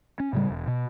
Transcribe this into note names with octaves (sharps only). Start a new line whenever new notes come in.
C#4
A2 C#3 G3
E1
B2